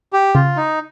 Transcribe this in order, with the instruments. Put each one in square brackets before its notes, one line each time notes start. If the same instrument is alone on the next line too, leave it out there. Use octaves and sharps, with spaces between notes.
[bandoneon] G4
[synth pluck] C#3 [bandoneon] F4
[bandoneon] D#4